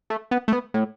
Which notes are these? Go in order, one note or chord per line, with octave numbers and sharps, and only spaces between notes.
A3
B3
A3
B3
A2